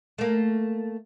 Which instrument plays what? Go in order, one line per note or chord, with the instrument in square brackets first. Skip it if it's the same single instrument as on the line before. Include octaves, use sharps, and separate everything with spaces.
[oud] A3 A#3